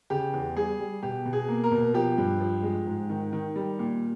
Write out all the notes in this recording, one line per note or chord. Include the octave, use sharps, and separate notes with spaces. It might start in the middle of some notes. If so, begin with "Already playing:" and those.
C#3 G4
E2
G3 G#4
G3
B2 G4
B2
G#4
A#3
A#4
B2
F3 G4
G2
F3
G#3
G#2
D#3
D#3
G3
A#2